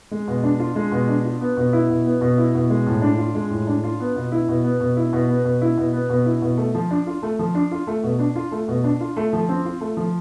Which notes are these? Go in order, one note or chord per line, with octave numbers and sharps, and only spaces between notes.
G#3
B2
D4
F4
G#3
B2
D4
F4
B3
B2
E4
B2
B3
B2
E4
B2
G#3
A2
D4
F4
G#3
A2
D4
F4
B3
B2
E4
B2
B3
B2
E4
B2
B3
B2
E4
B2
B3
B2
E4
B2
A3
F3
D4
F4
A3
F3
D4
F4
A3
B2
D4
F4
A3
B2
D4
F4
A3
F3
C4
F4
A3
F3